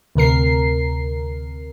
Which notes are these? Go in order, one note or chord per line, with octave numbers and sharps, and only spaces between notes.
D2 C3 A#4 C7